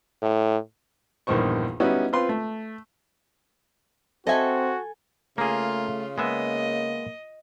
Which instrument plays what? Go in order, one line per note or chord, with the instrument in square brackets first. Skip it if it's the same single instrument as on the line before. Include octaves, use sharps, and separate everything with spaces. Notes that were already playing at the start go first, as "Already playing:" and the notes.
[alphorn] A2
[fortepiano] A#1 E2 G2 D#3 C5 C#6
G3 B3 C#4 D#4 E4 F#4
C4 F4 B4 C6
A3
[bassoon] C4 [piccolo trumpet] F#4 [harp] A4 G#5 A5 [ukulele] D#5 E5
[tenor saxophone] C#3 [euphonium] A3 [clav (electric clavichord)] A#3 G#4 [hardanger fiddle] F4
[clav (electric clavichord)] G#3 B3 E5 [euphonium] A#3 [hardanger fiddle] D#5